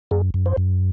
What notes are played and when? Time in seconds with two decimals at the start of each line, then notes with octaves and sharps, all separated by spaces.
0.11 F#2 G#4
0.34 F#2
0.46 C5
0.57 F#2